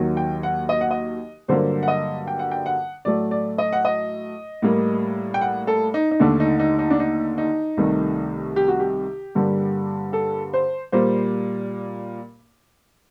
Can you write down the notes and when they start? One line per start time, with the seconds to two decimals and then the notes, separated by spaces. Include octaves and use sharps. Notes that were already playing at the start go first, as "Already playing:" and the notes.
Already playing: D#2 D#3 F#3
0.17 G5
0.43 F#5
0.69 D#5
0.81 F#5
0.91 D#5
1.48 G2 D3 F#3 A#3 C5
1.83 F#5
1.88 D#5
2.27 G5
2.39 F#5
2.51 G5
2.66 F#5
3.05 A2 F#3 A3 D5
3.31 D5
3.58 D#5
3.73 F#5
3.85 D#5
4.62 A2 G3 A#3
5.34 G5
5.41 F#5
5.67 A4
5.94 D#4
6.11 D#4
6.20 D#2 D3 A3 D4
6.40 D#4
6.59 D#4
6.79 D#4
6.90 D4
6.99 D#4
7.38 D#4
7.77 C2 C3 D#3 A3
8.56 G4
8.68 F#4
8.80 G4
9.35 G2 D3 G3 A#3
10.13 A4
10.53 C5
10.92 A#2 G3 A#3 C5